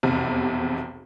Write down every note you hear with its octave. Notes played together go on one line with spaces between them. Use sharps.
F1 B1 E2 C3